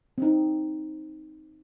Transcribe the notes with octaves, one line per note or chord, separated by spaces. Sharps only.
C4 D#4